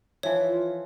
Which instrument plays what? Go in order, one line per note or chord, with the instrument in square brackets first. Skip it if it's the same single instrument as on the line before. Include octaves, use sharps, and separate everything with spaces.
[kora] E3 F3 E5 [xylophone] C#5
[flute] F4